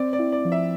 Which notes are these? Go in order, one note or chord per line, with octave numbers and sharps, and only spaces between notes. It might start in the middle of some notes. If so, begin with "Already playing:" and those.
Already playing: C4 D5
D5
E4
D5
F3
E5